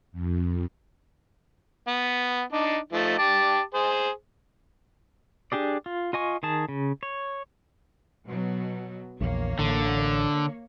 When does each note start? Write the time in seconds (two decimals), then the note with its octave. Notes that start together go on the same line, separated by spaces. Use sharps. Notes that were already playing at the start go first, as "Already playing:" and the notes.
0.12 F2
1.88 B3
2.53 D4 D#4
2.93 F3 A3 D#4
3.19 G4 A5 D6
3.74 G#4 C5
5.52 D4 G4 G#4 D5
5.86 F4
6.13 F4 D#5 G#5 C#6
6.43 D#3 G#4 A5
6.69 C#3
7.03 C#5
8.25 B2 F#3
9.21 A#1 E2 A#3 C#5
9.59 A1 D3